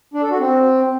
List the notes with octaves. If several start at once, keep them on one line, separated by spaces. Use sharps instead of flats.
D4
A4
F#4
C4